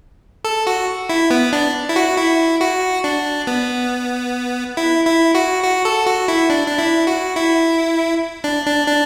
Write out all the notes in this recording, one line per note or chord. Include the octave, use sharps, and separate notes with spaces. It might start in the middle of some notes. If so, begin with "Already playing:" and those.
A4
F#4
E4
B3
D4
E4
F#4
E4
F#4
D4
B3
E4
E4
F#4
F#4
A4
F#4
E4
D4
D4
E4
F#4
E4
D4
D4
D4